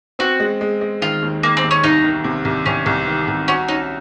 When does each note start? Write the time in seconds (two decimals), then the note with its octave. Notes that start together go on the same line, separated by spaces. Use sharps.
0.19 C4 F#4
0.40 G#3
0.61 G#3
0.81 G#3
1.01 D#3 F4
1.22 D#2
1.43 D#3 A#3
1.57 C4
1.63 D#2
1.71 C#4
1.84 C2 D#4
2.04 D#3
2.24 C3
2.45 C2
2.66 C2 C#4
2.86 C2
3.07 D#3
3.28 C2
3.48 C#4 F#4
3.68 C#4 D#4